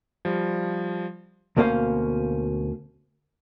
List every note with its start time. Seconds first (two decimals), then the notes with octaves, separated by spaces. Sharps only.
0.25 F3 G3
1.57 D2 B2 A#3 C#4 C5 F5